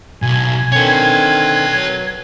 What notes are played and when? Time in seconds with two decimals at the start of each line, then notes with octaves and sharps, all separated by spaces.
0.22 B1 G#5 G#6
0.72 D3 D#3 C4 B4 C#5
1.73 F#3